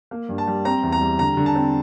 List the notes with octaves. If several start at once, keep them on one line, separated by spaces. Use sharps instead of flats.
A#3
G2
A5
G3
C4 A#5
E2
A#5
G3
D3 A#5
D3
A5
C4